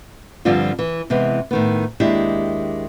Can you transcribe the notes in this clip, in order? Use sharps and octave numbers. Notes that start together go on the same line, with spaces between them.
G2 D3 F3 G3 C4 F4
E3
C3 E3 G#3 B3
A2 D#3 B3
D#2 G#3 D4 E4 G4